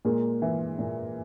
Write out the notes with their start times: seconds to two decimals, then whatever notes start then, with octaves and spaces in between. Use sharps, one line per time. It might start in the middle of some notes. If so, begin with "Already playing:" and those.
0.05 A#2 G#3 A#3
0.42 E3
0.79 A#2